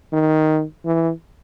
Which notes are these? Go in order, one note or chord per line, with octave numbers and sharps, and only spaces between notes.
D#3
E3